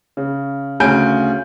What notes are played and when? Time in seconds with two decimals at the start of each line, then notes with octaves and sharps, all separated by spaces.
0.17 C#3
0.80 D2 C#3 G#5 G6 D7